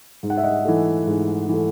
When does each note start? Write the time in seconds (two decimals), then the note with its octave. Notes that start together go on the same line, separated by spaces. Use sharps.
0.23 G#2
0.30 F#5
0.37 E5
0.44 D#5 F#5
0.65 E3 A3
1.07 G#2
1.49 E3 A3